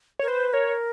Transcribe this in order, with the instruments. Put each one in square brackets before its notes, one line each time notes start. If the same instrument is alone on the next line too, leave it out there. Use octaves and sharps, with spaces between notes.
[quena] A#4 [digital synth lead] C#5
[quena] B4 [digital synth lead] C5
[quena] A#4 [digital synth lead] C#5